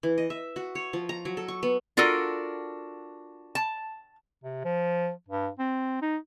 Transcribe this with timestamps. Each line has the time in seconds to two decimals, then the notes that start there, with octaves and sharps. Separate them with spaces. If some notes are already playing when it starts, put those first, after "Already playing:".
0.03 E3
0.18 D#5
0.30 E5
0.56 F#4
0.75 C#5
0.93 F3
1.09 A#5
1.25 F#3
1.37 A4
1.48 C#6
1.63 B3
1.97 D4 F4 F#4 A4 A#4
3.55 A5
4.44 C3
4.65 F3
5.28 G2
5.59 C4
6.02 D#4